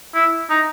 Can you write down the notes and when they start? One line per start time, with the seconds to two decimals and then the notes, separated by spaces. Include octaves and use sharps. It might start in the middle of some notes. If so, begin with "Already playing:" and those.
0.15 E4
0.50 D#4